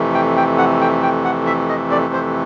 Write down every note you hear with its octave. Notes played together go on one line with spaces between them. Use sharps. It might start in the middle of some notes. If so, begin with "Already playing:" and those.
Already playing: F2 C3 E3 A3
G5
G5
F#5
G5
G5
F#5
E5
D#5
D5
C5